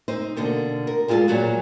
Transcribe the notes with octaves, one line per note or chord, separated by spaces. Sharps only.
C4 D#4 C5
B2 D3 A#3
A#4
G3 G#3 F4 F#4 A4
A#2 F#3 F#4